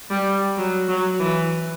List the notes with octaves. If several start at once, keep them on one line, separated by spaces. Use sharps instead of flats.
G3
F#3
F#3
E3